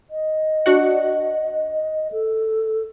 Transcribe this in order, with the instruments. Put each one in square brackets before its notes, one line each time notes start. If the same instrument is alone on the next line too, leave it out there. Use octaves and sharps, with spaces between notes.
[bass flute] D#5
[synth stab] D4 F#4 F#5
[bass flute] A4